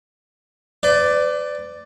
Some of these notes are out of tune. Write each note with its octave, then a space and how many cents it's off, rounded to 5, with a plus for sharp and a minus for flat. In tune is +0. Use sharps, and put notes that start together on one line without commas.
B4 +40 D5 +0